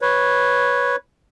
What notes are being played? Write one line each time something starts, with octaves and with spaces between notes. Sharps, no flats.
B4 C#5